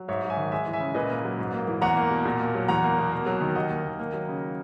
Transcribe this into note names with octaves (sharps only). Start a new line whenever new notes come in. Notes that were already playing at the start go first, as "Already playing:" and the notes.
Already playing: F#3
G#2 C#5 E5
F#3
E5 G#5
D#3
G#3 E5 G#5
E3
E5 G#5
C#3
A#2 B4 D#5
A#3
F#3
G#2
A#3
E3
E2 F#5 A#5
A#3
B2
A#2
A#3
F#3
E2 F#5 A#5
A#3
B2
A#3
F#3
D#3
D#2 D#5 F#5
A#3
D#3
A#3
F#3
C#3